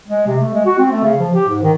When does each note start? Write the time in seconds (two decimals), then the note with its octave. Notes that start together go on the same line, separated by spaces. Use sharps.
0.08 G#3
0.27 C3
0.40 A3
0.54 G#3
0.65 F#4
0.78 C4
0.92 A3
1.03 C#3
1.19 F3
1.34 G4
1.48 G#2
1.62 D#3